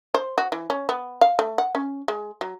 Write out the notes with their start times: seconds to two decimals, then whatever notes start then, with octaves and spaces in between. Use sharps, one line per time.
0.14 C5
0.38 F#4
0.52 E3
0.70 C#4
0.89 B3
1.21 F5
1.39 A3
1.58 F#5
1.75 C#4
2.08 G#3
2.41 F#3